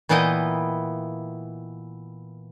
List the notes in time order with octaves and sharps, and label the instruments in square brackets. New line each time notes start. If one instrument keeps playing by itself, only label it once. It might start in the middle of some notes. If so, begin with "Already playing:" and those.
[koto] A#2 E3 B3 E4 D#5 G5